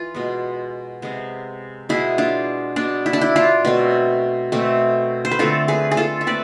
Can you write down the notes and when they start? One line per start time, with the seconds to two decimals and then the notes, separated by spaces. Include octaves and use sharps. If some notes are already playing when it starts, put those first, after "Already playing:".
Already playing: E3 F4 B4
0.15 B2 G#3 B3
1.02 C3 G#3 B3
1.89 B2 G#3 B3 E4 G#4
2.18 D4 F4
2.76 B2 B3 D4
3.06 E4
3.13 D4
3.21 E4
3.36 D4 F4
3.65 B2 A3 C4
4.52 B2 A3 C4
5.25 C5
5.31 B4
5.39 D3 A3 C4 F4 A4
5.68 G#4 B4
5.91 G#4
5.97 F4 A4
6.21 E5
6.27 A3 C4 B4 D5